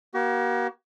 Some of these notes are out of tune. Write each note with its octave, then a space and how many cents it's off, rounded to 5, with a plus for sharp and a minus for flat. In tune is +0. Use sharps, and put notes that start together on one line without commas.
A#3 +40 F#4 +45